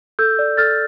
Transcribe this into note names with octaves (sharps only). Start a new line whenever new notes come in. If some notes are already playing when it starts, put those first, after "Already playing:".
A4 E6 G6
D5
A4 F6 A6